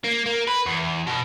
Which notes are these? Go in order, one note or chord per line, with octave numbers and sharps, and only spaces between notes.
A#3
A#3
B4
E2
B2